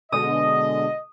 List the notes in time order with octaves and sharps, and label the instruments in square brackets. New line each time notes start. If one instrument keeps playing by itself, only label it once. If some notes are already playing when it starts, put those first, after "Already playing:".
[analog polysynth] B2 D3 G#3 [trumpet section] D#5 [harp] D#6